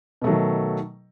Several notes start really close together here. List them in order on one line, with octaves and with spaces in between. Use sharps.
B2 A3 F#3 D#3